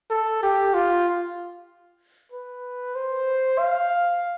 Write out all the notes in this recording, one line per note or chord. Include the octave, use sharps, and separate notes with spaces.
A4
G4
F4
B4
C5
F5